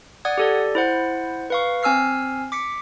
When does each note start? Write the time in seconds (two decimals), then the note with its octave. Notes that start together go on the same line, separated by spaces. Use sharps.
0.25 D5 F#5 D#6 G#6
0.38 G4 A4 D5
0.75 E4 C5 F#5
1.50 B4 F5 C#6
1.83 C4 G#5 E6 F6 C7
2.52 D6 B6 C#7